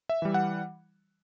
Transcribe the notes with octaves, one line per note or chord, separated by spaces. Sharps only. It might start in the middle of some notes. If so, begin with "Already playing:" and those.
E5
E3 G3
F#5